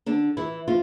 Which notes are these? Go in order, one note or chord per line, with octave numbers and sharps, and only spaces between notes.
D3 D4
E3 E4
F3 F4